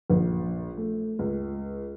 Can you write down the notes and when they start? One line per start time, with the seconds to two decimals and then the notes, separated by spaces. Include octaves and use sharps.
0.10 A#1
0.77 A3
1.19 C#2